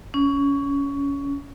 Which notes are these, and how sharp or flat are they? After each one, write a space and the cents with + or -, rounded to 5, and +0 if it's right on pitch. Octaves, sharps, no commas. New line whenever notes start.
C#4 +20